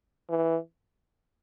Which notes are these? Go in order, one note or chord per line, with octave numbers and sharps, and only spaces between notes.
E3